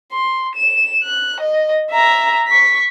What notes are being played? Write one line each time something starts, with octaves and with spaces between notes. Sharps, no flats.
C6
E7
F#6
D#5
E5 A#5
C#6 B6